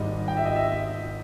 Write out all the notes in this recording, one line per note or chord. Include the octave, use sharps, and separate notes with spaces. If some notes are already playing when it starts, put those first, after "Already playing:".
Already playing: G#1 G#2 G3 D#5
G5
E5
D#5
E5